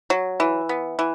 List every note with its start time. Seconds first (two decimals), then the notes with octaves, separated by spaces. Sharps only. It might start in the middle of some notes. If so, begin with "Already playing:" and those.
0.10 F#3
0.40 E3
0.69 B3
0.99 E3